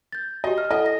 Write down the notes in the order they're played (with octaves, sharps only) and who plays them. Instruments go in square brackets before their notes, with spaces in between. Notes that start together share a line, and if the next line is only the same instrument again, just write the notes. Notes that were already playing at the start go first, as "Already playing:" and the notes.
[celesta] G6 A6
[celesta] F#4 G4 [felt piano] D#5
[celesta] F6
[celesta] E4 A4 F#5 [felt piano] D#5
[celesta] A#6